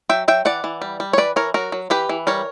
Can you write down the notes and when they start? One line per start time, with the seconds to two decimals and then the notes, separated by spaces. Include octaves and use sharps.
0.09 F#3 E5 G5
0.28 F#3 E5 G5
0.45 E3 D5 F#5
0.64 E3
0.82 G3
1.00 G3
1.13 C#5
1.18 E3 B4 D5
1.36 E3 A#4 C#5
1.54 F#3 F#4 A#4
1.72 F#3
1.90 E3 G4 B4
2.09 E3
2.27 G3 A#4 C#5